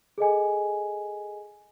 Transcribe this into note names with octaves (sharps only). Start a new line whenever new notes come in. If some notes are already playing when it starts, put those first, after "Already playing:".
G#4 A4 D#5 G#5